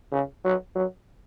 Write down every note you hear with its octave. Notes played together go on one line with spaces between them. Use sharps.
C#3
F#3
F#3